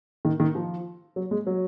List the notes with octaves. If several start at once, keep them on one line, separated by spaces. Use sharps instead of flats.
D#3
D#3
F3
F#3
G#3
F#3